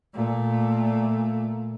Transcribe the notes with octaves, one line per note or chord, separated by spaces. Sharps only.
A#2 A3